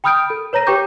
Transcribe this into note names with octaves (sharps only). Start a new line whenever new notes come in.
G5 B5 D#6 F6 G6 D7
A4
B4 C#5 A#5 A#6 D#7
G4 B4 G5 C#6 D6 G6